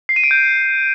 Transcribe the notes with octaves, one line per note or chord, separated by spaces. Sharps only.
C7
D#7
D7
G6